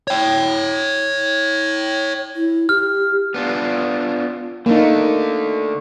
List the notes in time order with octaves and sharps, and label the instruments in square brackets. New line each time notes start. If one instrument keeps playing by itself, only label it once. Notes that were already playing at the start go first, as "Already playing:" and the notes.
[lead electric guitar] C#5 G5
[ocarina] E4
[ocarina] G4 [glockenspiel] F6
[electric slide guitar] B3 D4 F4
[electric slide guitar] D3 A3 [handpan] A#3 D#4